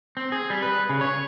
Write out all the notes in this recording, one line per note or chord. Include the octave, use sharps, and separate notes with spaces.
C4
G#4
G3
B4
C#3
C#5